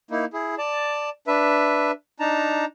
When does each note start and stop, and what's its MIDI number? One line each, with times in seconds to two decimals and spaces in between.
0.11 0.25 58
0.11 0.25 63
0.11 0.25 64
0.33 0.55 64
0.33 0.55 68
0.58 1.10 74
0.58 1.10 81
1.27 1.91 62
1.27 1.91 71
1.27 1.91 76
2.20 2.65 62
2.20 2.65 63
2.20 2.65 81
2.20 2.65 82